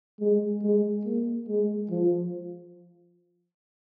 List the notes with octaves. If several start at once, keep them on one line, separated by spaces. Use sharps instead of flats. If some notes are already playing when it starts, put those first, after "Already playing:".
G#3
G#3
A#3
G#3
F3